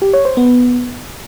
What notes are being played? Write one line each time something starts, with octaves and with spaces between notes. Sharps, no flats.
G4
C#5
C5
B3